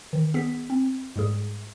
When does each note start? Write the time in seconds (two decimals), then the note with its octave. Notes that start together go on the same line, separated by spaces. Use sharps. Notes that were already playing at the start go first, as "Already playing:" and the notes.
0.13 D#3
0.34 B3 G#4 B6
0.70 C4
1.16 G#2 G3 G#3 G#4